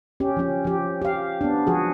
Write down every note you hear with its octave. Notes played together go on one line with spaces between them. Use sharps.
C#4 G4
F3 C#4
F3 G4
G4 F5
B3 D4
F3 F#4 G#4